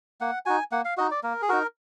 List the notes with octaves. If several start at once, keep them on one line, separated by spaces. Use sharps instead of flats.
A#3 F#5
D#4 F#4 G#5
A#3 F#5
F5
D#4 F#4 D#5
D5
A#3 A#4
G#4
D#4 F#4 A#4